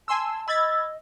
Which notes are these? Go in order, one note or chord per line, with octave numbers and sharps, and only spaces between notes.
G#5 A5 C6 E6
D#5 B5 E6 G#6 A6